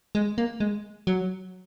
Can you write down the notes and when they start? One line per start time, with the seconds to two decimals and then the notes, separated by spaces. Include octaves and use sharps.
0.15 G#3
0.38 A#3
0.60 G#3
1.07 F#3